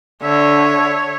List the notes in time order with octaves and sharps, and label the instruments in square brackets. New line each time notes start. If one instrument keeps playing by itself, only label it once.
[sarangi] D3 [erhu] C#5 [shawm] E5